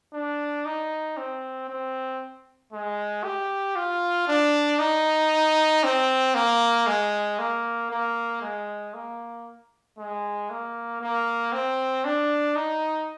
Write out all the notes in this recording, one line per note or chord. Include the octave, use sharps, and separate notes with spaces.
D4
D#4
C4
C4
G#3
G4
F4
D4
D#4
C4
A#3
G#3
A#3
A#3
G#3
A#3
G#3
A#3
A#3
C4
D4
D#4